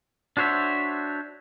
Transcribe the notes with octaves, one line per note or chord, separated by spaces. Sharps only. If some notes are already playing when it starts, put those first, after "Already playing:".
D4 F#4 C5 C#5 E5